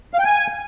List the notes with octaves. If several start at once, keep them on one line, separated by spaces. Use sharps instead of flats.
F5
G5
G#5